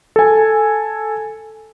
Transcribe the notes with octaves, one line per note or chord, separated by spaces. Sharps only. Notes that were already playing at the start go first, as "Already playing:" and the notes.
A4 G#5